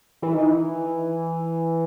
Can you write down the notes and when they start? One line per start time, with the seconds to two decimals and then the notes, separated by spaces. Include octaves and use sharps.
0.22 E3
0.35 D#3
0.47 E3